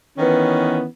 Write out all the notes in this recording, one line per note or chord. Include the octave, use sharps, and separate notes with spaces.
D#3 E3 B3 C#4